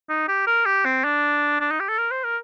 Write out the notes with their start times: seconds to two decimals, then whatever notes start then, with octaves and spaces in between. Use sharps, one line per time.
0.09 D#4
0.28 G4
0.47 A#4
0.66 G4
0.85 C4
1.04 D4
1.60 D4
1.71 D#4
1.80 G4
1.89 A4
1.98 A#4
2.11 C5
2.24 A#4